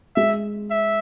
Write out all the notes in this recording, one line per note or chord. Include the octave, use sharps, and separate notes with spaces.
G#3 E5
E5